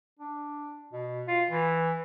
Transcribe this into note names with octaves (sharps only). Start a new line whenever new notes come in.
D4
B2
F4
E3